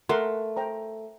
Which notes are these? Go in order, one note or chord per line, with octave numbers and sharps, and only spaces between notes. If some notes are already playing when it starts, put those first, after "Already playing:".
A3 A#4 F#5 C6
C5 G5 A#5